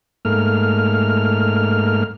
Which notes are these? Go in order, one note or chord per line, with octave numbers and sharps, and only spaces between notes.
G#2 A3 A#3 F6